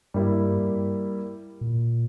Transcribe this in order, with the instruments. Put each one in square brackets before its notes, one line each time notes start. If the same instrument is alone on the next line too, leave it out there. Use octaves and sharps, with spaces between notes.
[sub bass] G2 [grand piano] G3 A#3 E4 G4
[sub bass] A#2